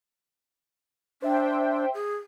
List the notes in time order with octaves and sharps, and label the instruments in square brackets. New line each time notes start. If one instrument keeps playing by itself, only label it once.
[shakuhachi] D4 [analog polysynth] C5 E5 G5
[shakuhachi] G#4